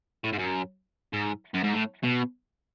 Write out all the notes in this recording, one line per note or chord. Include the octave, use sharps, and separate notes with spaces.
A2
G#2
F#2
G#2
F#2
G#2
A2
B2